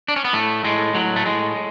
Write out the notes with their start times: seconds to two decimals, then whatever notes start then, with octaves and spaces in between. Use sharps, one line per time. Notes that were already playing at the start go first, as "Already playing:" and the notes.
0.08 D4
0.16 C#4
0.25 B3
0.33 A2 A3
0.64 A2 G#3
0.94 A2 F#3
1.16 A3
1.25 A2 G#3
1.55 A2